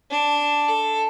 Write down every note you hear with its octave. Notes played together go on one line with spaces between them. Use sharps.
D4
A4